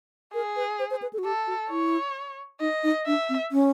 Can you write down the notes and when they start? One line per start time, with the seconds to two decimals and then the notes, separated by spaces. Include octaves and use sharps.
0.34 G#4 A#4
0.56 B4
0.79 C5
0.91 C5
1.02 B4
1.13 A4
1.18 F#4
1.25 G4 A4
1.47 F#4
1.70 E4 C#5
2.60 D#4 D#5
2.84 D#4
3.06 D4 E5
3.29 C4
3.52 C#4